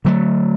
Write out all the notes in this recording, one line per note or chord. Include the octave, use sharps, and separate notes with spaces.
D3 F#3 A3